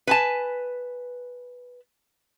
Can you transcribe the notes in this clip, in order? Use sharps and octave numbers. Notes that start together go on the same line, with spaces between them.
B4 G#5 A5